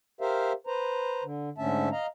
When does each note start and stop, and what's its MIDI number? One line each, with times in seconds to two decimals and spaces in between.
0.21 0.52 67
0.21 0.52 70
0.21 0.52 72
0.21 0.52 76
0.21 0.52 77
0.67 1.23 71
0.67 1.23 72
0.67 1.23 82
1.23 1.49 50
1.58 1.89 44
1.58 1.89 50
1.58 1.89 57
1.58 1.89 61
1.58 1.89 76
1.58 1.89 81
1.92 2.06 75
1.92 2.06 77
1.92 2.06 82